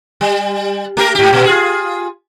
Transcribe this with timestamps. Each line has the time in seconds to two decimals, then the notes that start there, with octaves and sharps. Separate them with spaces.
0.21 G3
0.97 A3 G4 A#4
1.15 G#2 G4
1.33 A#2 B3
1.45 F4 G#4